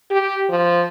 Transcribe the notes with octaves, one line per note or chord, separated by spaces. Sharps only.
G4
F3